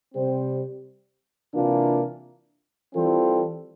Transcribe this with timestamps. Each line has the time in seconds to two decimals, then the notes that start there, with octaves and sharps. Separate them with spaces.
0.13 C3 G3 C4 G4 C5
1.53 C3 E3 A#3 D4 F4
2.94 E3 G3 C4 F4 A4